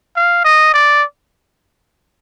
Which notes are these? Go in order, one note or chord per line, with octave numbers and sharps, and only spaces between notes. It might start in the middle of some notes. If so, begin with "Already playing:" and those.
F5
D#5
D5